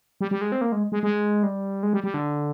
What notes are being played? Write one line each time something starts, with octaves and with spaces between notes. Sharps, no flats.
G3
G3
G#3
C4
A#3
G#3
G#3
G#3
G3
G#3
G3
G3
D3